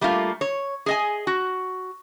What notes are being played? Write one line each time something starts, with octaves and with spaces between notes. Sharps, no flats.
G3 A3 A#3 F4
C#5
G#4 D#5 G#5
F#4